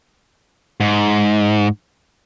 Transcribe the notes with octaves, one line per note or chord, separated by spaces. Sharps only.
G#2